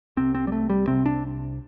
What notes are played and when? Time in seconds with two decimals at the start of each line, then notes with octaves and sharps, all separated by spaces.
0.17 C2 C3 C4
0.35 C4
0.47 G3
0.52 A3
0.70 G3
0.87 C2 C3 C4
1.06 D4